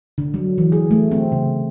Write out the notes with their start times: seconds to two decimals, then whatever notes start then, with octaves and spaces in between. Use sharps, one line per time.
0.18 D3
0.34 F#3
0.58 E3
0.72 G#4
0.91 A3
1.11 C4
1.32 C#3